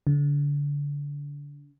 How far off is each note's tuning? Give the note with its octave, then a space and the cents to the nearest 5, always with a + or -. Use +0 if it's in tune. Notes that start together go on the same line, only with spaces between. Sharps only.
D3 -30